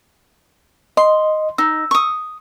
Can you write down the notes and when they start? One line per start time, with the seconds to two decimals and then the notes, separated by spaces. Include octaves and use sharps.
0.97 D#5 C6
1.58 D#4 E6
1.91 C#6 D#6